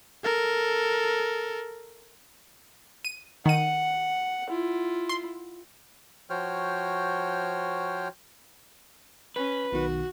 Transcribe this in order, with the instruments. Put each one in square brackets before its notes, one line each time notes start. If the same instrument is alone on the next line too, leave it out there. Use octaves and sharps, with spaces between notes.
[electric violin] A4 A#4
[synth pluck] D#7
[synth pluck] D#3 D#7 [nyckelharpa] F#5
[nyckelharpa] E4 F4
[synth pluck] C6
[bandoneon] F3 F#4 C5 C#5 G5 F6
[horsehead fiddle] C#4 [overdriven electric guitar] B4
[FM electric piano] B1 B2 D#3 [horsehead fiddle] F#4